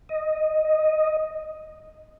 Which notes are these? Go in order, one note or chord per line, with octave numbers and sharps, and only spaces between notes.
D#5